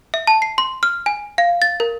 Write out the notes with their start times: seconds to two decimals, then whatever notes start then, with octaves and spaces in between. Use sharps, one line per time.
0.14 E5
0.27 A5
0.42 C7
0.58 C6
0.83 F6
1.06 G#5
1.38 F5
1.62 A6
1.80 A#4